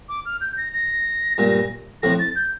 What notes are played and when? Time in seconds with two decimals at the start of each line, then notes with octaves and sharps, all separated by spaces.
0.09 D6
0.25 F6
0.41 G6
0.57 A#6
0.74 A#6
1.38 G2 A#2
2.03 F2 A2 A#6
2.19 A6
2.36 G6